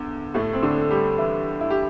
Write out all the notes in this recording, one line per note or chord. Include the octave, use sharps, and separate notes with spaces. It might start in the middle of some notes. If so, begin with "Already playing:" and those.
Already playing: E2 D3
A2 A3
C4
D3 D4
G3 G4
E3 E4
E4
G4